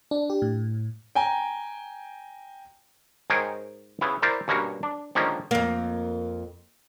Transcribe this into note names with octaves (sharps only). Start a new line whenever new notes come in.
D4
G4
A2
G5 G#5 A#5
G#2 G#4 A#4 C#5 G5 G#5
C#3 B3 E4
E4 A#4 C5 D5
G2 B2 A#3 C#4 F#4
D4
D3 D#3 F3 G#3 A#3 C#4
F2 A#3